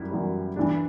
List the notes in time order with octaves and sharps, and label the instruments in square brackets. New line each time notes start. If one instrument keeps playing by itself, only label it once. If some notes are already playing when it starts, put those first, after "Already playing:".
Already playing: [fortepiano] F#2 G3 E4
F#2 E3 G3
G2 E3 G3 D4